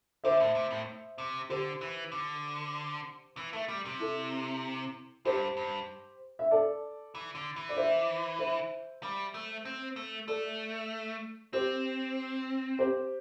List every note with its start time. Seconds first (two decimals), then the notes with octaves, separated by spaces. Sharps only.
0.24 D3 C5 E5
0.40 A2
0.55 C3
0.71 A2
1.18 C3
1.49 D3 G4 C5
1.81 E3
2.12 D3
3.37 E3
3.53 A3
3.69 G3
3.85 C3
4.00 E4 A4
5.25 G2 G4 C5
5.57 G2
6.39 E5
6.51 A4 D5
7.15 E3
7.35 D3
7.56 E3
7.69 D5
7.76 C5 E5
8.39 C5 E5
9.03 G3
9.34 A3
9.65 C4
9.96 A3
10.28 A3 A4 D5
11.53 C4 G4 C5
12.79 G4 C5